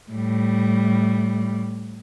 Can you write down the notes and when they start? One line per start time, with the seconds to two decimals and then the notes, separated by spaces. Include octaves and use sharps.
0.12 A2 G3